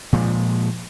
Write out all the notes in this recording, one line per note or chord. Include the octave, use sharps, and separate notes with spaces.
A#2 F3 G#3